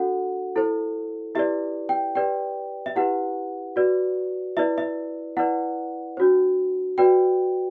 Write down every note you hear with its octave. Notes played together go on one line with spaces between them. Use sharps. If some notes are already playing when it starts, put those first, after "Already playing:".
Already playing: D4 F#4 A4 F#5
E4 A4 C5
E4 G4 B4 D5 E5
G5
G4 B4 D5 G5
E5
E4 G4 B4 F#5
F#4 B4 D5
E4 B4 D5 E5
E5
E4 B4 D5 F#5
D4 F#4 C5
F#4 B4 D5 G5